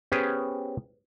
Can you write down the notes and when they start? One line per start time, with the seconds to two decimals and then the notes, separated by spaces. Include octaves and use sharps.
0.12 B3 C#4 G4 G#4 B4 C5